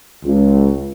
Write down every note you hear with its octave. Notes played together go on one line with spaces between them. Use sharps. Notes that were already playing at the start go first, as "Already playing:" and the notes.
C#2